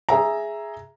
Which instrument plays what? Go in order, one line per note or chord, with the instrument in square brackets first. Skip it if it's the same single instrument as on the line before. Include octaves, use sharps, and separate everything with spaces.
[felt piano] G#4 E5 A#5